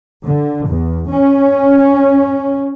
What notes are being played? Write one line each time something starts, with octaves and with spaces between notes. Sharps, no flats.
D3
E2
C#4